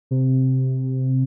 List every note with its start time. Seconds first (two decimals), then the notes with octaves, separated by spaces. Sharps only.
0.11 C3